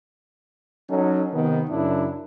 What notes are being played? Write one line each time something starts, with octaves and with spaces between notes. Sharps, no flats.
F#3 C#4 D#4 A4
C3 D#3 B3
F#2 C#3 D4 E4